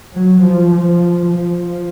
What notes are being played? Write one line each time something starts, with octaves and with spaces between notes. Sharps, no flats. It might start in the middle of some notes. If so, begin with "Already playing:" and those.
F#3
F3
F3
F3